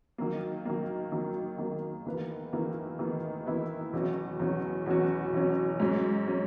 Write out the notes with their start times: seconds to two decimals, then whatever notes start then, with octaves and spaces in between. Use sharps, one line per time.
0.18 D#3 F#3 A#3
0.65 D#3 F#3 A#3
1.12 D#3 F#3 A#3
1.59 D#3 F#3 A#3
2.06 E2 D#3 A#3 E4 B4
2.52 E2 D#3 A#3 E4 B4
2.99 E2 D#3 A#3 E4 B4
3.46 E2 D#3 A#3 E4 B4
3.93 E2 B2 F#3 C#4 F#4
4.40 E2 B2 F#3 C#4 F#4
4.86 E2 B2 F#3 C#4 F#4
5.33 E2 B2 F#3 C#4 F#4
5.80 G#2 F#3 C#4
6.27 F#3 C#4